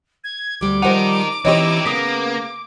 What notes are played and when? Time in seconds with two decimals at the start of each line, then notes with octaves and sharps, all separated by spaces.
0.24 G#6
0.61 D2 G3 D6
0.82 F3 G3 D#4 A#4 C5 F#5
1.45 E3 C4 D#4 E4 G4 C#5 D#5 C#6
1.86 C#3 A#3 B3 D#6 B6